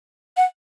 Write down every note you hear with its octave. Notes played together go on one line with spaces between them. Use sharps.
F#5